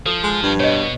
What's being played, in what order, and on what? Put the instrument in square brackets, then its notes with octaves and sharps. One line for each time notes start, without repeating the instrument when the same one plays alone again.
[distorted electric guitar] F3 [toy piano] A4
[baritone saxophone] G#3
G2
[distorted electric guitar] B2 [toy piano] C#5 D#5